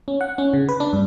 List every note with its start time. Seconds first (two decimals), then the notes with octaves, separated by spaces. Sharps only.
0.08 C#4
0.21 F#5
0.38 C#4
0.53 C#3
0.69 B4
0.80 D4
0.93 G2